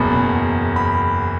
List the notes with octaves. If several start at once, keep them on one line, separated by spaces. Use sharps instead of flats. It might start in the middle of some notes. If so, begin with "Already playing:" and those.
Already playing: F#1 E2 B2 A#5 B5
B5